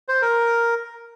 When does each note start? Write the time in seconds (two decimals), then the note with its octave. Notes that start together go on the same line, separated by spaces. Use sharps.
0.08 C5
0.22 A#4